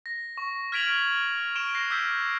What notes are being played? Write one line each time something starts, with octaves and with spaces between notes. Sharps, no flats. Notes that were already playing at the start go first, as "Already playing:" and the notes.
A#6
C#6
F6 G#6 B6 D7 F7 F#7
C#6 D7 E7 F7 G7
F#6 A#6 C7
D6 E6 F6 G6 B6 D7